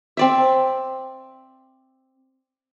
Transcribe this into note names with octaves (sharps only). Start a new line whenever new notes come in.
C4 D5 E5